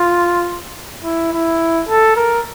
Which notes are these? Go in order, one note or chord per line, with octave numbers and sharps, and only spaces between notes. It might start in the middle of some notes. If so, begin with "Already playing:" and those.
Already playing: F4
E4
E4
A4
A#4